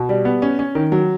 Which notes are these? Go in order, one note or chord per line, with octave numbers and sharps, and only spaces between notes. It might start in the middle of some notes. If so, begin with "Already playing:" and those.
Already playing: B2
G3
B3
C#4
C#4
D#3
F#3